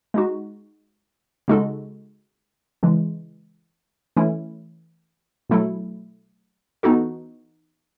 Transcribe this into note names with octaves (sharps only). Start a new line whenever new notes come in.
G#3 D#4 F#4
C#3 G#3 D#4 F#4 A4
C#3 E3 G#3
E3 A3 C#4 E4
B2 F#3 A3 E4 A4
E3 B3 D#4 F#4 A4